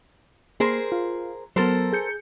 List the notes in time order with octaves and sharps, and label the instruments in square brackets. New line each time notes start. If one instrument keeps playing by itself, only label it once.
[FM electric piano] A#3 [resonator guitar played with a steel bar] G#4 A#4 C5
[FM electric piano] F4
[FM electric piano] F#3 B3 [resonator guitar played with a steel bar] A4 A#4 C5
[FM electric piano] G#4 G6 C#7